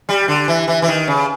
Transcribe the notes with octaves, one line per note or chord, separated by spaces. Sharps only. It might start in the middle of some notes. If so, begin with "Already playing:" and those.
G3
D3
E3
E3
E3
D#3
C#3